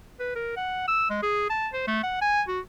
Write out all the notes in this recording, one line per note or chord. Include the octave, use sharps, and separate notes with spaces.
B4
A#4
F#5
E6
G#3
G#4
A5
C5
A3
F#5
G#5
F#4